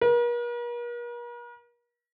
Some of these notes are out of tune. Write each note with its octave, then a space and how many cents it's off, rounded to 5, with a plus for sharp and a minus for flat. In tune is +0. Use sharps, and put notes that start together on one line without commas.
A#4 +45